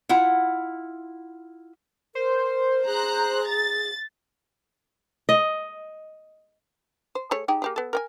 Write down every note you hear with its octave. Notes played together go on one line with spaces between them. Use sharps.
E4 F4 F#5
A#4 C5
G#4 A#5 F#6
A6
D#5
C5
A3 G#4 C#5
D#4 G4 G#4
A#3 G4 G#4
B3 A4
A#4 G5 G#5